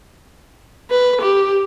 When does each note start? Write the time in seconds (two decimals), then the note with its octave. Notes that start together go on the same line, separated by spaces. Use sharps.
0.90 B4
1.21 G4